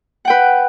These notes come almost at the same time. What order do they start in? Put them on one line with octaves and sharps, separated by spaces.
F#5 G5 B4